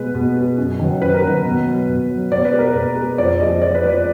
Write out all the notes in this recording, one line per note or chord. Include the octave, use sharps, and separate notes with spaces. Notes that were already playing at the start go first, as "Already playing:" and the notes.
Already playing: B2 G#3 B4
B2
G#3
F#2
D#3 F#3
F#2 B4
A#4
D#3 F#3 B4
B2
F#3
B2
F#3
B2 D5
B4
G#3
A#4
B2 B4
G#3
F2 D5
F3 G#3 D#5
F2 D5
B4
F3 G#3 D5